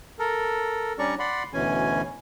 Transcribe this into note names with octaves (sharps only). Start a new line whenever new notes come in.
A4 A#4
G3 C#4 D4 D5 A#5 C#6
D5 F#5 B5 C6
D2 B2 E3 C#4 G#5